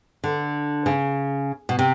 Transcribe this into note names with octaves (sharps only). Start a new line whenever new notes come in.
D3
C#3
B2
C3